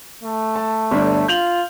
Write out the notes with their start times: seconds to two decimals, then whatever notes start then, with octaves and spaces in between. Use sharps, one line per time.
0.23 A3
0.56 A5
0.91 G1 D4
1.28 F4 G6 F7 F#7